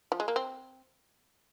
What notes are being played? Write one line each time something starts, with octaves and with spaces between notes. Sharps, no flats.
F3
G#3
A#3
C4